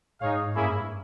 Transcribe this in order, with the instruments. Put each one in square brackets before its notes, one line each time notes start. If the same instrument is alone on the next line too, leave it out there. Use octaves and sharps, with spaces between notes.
[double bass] G#2 [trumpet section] D#4 G#4 C#5 F5
[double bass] G2 [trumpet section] A#3 C#4 E4 G#4